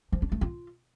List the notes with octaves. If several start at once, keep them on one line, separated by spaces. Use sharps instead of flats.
F3
D4
A3
F4